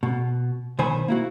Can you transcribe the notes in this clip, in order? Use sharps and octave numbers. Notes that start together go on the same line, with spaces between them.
B2
B1 D#3 C5 G#5 B5
A#3 E4 F#4